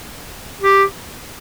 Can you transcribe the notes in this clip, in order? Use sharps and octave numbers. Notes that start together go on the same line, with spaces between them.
G4